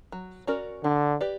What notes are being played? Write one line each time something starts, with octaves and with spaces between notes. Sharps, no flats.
F#3
C#4 F#4 A#4 D5
D3 D4
G4 B4 D5